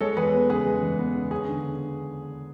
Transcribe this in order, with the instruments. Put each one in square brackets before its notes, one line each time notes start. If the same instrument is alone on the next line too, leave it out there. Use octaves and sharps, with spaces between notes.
[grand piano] G#3 A4 C#5
E2 G#4 B4
B3
C#3 G#4 B4
G#3
E2
B3
C#3
C#4 G#4
D3